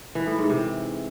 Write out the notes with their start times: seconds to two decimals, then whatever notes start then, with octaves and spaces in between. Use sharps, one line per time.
0.15 E3
0.27 A2
0.38 G#2
0.50 C3